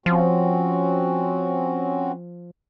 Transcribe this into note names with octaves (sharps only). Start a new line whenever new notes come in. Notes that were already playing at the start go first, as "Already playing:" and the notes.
F3 C4 C#4 F#4